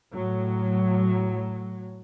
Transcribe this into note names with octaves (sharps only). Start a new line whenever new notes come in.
A2 F#3